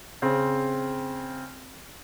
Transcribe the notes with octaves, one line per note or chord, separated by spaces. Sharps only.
C#3 C4